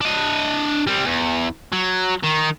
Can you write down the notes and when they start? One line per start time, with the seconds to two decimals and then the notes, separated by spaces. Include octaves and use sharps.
0.01 D4 D#5
0.87 G3 C4
1.06 E2
1.73 F#3
2.24 D#3